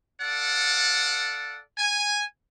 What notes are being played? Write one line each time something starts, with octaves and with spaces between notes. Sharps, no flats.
A4 D5 F5 F#5
G#5